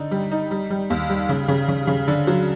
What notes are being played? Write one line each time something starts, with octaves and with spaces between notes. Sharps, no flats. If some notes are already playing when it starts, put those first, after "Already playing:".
Already playing: D3 D#4
G3
D#4
G3
G3
D#2
G3
C#3
C#3
C#3
C#3
D3
F#3